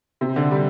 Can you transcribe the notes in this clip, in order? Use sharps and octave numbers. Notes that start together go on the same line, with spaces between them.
C3
D3
G3